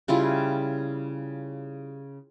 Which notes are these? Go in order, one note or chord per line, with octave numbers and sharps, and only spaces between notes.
C#3 G3 E4 F4